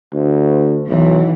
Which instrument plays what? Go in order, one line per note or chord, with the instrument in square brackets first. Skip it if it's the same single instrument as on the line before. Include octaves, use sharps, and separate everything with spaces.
[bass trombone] D2
[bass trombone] B1 [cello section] E3